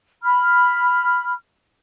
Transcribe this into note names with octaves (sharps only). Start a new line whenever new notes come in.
B5 F6